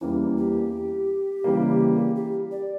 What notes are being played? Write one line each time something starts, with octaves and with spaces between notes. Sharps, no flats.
E2 E3 G3 A#3 C#4
G4
C#3 E3 G3 A#3
G4
D5